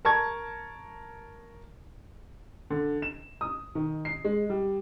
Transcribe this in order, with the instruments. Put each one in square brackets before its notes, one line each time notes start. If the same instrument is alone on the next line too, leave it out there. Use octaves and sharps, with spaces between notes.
[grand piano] A#4 A5 C#6 G#6
[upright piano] D3
E7
D#6
D#3
C7
G#3
G3